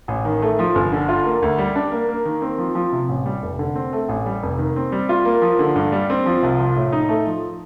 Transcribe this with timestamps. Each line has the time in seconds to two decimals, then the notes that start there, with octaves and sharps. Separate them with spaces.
0.08 A1
0.25 D#3
0.42 A3
0.59 F3
0.75 G1
0.92 D3
1.09 F4
1.25 A#3
1.42 D2
1.58 G3
1.76 D4
1.92 A#3
2.09 A#3
2.25 D#3
2.42 C4
2.58 F3
2.75 F3
2.92 C3
3.09 A1
3.26 G3
3.42 F1
3.59 D3
3.75 C4
3.93 A3
4.09 A1
4.26 G3
4.43 F1
4.58 D#3
4.76 C4
4.92 G3
5.09 F4
5.25 A#3
5.42 F3
5.59 D3
5.76 G2
5.92 G3
6.10 C4
6.26 F3
6.43 C2
6.59 F3
6.76 A2
6.92 D#4
7.09 A3
7.27 F3